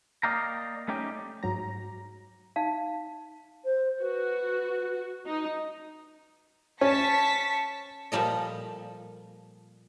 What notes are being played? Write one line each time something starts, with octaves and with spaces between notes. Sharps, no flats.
A#3 D5 D#5 F5 G5 A#5
A3 C#4 D#4 G4
G#2 F#3 A#5
D#4 F5 A5
C5
F#4 B4
D#4
C#4 A5 C#6 B6
A#2 F3 G3 A4 D#5